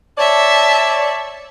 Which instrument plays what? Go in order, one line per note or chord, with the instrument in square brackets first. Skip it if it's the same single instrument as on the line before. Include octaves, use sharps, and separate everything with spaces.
[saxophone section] C#5 D5 [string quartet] E5 A5